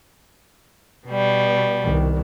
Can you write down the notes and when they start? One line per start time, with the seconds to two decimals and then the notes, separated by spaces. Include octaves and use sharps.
1.08 B2 G3
1.83 C2 D#3